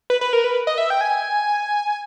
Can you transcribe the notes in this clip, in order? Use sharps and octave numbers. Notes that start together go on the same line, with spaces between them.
B4
B4
A#4
B4
D#5
E5
G5
G#5